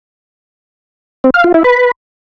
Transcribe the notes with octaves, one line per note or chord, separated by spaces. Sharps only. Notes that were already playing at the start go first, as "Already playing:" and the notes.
C4
F5
F4
E4
B4